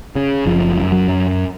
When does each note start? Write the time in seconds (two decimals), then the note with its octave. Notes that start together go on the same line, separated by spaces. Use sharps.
0.16 C#3
0.46 F#1 F3
0.78 F#2
0.92 F#3
1.08 F#2